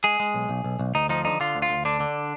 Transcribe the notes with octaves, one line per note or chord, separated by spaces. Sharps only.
G#3 G#4
G#3
B1
B1
B1
B1
D2 D#4
F3 D#4
D3 D#4
D3 F4
D2
F4
D2
D3 D4
D3